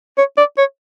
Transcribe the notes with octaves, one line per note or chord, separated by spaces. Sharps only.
C#5
D5
C#5